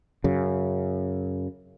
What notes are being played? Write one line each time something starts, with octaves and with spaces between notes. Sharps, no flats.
F#2 C#3